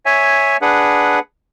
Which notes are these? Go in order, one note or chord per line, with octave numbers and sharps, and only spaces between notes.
C#5 E5 G#5
D4 G#4 B4 F#5